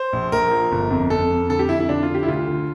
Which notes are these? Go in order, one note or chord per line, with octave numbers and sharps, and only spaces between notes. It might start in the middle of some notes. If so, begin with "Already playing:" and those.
Already playing: C5
A#1
A#1 A#4
F3
G1
F2
F2 A4
F2
D3 A4
G4
F2 E4
E4
D3 D4
F4
D3
G4
E4
D2 F4
D3